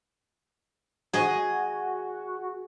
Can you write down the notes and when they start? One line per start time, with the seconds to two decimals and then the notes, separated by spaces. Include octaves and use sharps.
1.13 F#4 G#4 D#5